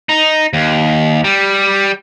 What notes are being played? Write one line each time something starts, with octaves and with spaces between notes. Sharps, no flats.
D#4
D#2
G3